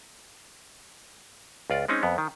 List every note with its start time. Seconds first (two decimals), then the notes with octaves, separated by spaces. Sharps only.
1.70 C#2 F4 D5
1.88 G#3 C4 C#4 D#4
2.03 F2 B3
2.18 D#3